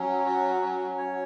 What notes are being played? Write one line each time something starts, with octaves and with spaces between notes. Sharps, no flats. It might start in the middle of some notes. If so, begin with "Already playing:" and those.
Already playing: F#3 C#4
F#4
C#4
C#5